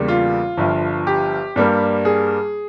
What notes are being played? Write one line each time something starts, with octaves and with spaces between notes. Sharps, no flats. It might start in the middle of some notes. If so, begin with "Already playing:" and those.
Already playing: E2 C#3 G3 A#3
F4
G1 G2 F3
G4
G2 G3 A#3
G#4